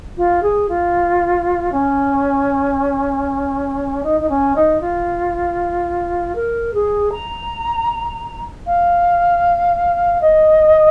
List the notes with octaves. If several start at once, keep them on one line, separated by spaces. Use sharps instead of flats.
F4
G#4
F4
C#4
D#4
D#4
C#4
D#4
F4
A#4
G#4
A#5
F5
D#5